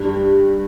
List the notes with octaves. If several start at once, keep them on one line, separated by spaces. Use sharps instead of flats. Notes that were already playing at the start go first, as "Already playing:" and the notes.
Already playing: G2